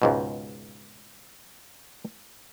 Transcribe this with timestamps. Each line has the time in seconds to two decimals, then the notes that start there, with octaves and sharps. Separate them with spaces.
0.02 C#2 G#2 B2